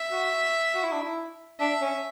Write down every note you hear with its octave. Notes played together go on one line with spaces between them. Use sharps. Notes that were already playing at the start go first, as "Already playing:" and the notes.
Already playing: E5
F#4
F#4
E4
D4
E4
D4 E5
C#4